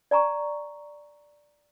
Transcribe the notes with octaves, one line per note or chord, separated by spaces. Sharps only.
D5 G#5 A#5 C#6